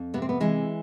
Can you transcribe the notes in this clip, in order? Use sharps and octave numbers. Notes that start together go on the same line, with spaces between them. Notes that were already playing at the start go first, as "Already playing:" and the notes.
Already playing: F2
C3 B3
C4
B3
E3 G#3